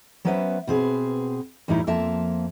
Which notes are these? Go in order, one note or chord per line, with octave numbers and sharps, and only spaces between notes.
F#3 B3 C#4 B4 C5 E5
B2 C4 G#4 B4
E2 A2 G3 D#4 E4
F2 F3 A#3 E5 A5